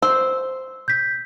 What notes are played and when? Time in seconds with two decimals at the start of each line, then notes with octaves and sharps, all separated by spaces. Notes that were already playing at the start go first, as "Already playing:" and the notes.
0.02 C5 E6
0.88 G6 B6